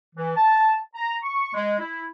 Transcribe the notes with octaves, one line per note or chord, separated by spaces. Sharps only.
E3
A5
A#5
C#6
G#3
E4